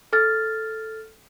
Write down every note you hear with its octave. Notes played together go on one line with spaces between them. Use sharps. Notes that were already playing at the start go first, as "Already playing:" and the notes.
A4 F6 A6